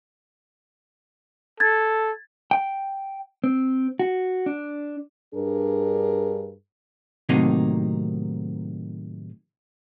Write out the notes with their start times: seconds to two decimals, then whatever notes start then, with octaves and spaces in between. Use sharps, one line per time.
1.60 A4 G#6 A6
2.51 G5
3.44 C4
3.99 F#4
4.46 D4
5.34 G2 D4 G#4 A#4
7.29 A2 C3 D#3 F#3 A#3 D#4